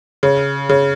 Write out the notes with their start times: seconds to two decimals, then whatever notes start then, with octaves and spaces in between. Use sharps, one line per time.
0.23 C#3
0.69 C#3